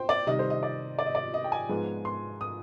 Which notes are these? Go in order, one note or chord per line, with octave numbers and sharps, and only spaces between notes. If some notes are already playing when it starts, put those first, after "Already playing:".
Already playing: C5 G5
D5
C3 D#3 G3 D#5
C5
D#5
D5
D5
D#5
D5
D#5
G5
G#5
G#2 F3 G#3 B3
C6
D#6